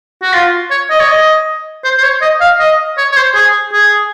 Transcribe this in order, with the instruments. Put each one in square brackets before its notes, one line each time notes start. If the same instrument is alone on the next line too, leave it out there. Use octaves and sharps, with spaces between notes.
[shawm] F#4
F4
C#5
D#5
C#5
D#5
C5
C5
C#5
D#5
F5
D#5
C#5
C#5
C5
G#4
G#4